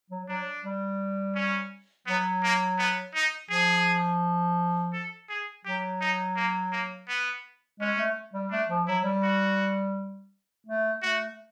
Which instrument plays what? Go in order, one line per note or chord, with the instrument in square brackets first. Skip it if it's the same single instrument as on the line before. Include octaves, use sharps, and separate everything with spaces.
[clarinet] F#3
[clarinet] F#3 [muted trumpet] D4
[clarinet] G3
[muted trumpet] C#4
[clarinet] F#3 [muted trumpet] B3
[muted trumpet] A#3
B3
D#4
[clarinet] F3 [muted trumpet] G#4
[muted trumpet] A4
G#4
[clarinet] F#3 [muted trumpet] G4
[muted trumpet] D#4
A#3
A#3
B3
[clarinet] G#3 [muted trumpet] C#4
[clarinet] A3
G3
[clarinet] A3 [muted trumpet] D4
[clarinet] F3
[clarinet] F#3 [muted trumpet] E4
[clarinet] G3
[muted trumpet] F#4
[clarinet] A3
[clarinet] A3 [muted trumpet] F#4